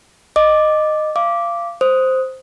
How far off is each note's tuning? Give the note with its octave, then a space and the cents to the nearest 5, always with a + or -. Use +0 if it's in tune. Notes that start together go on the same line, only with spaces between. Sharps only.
D#5 -10 D6 +5
F5 -25 D6 -5
C5 +0 D#6 +10